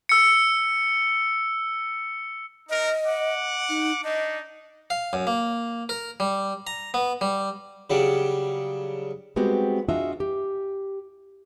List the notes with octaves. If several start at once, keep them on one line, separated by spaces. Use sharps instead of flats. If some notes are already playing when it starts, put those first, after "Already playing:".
E6 C#7
D#4 A#4 D#5
F#5 D6
D#4
D4 D#4 D#5
F5
F#2
A#3
A#4
G3
A#5
B3
G3
C#3 F#3 G3 D4
G3 G#3 B3 C4 F#4 G4
D4 F4 F#4 G#4 D#5 E5
G4